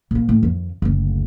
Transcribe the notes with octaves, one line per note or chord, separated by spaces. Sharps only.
A#1 A#3
A2
F2 D#3
F#1 D2